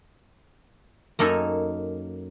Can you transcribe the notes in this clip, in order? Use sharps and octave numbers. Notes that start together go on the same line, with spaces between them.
F#2 A#3 D#4 A4 G#5 A#5